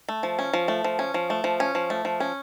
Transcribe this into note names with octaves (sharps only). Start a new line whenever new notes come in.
A3
F3
C#4
F3
A3
F3
C#4
F3
A3
F3
C#4
F3
A3
F3
C#4